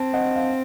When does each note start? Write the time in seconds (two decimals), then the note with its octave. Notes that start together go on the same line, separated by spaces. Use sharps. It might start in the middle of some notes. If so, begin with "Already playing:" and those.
Already playing: C4 A5
0.13 D#5 F#5
0.36 F5